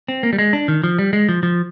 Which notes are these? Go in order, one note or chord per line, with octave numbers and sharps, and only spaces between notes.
C4
A#3
G3
G#3
D4
D#3
F3
G3
G#3
F3
F3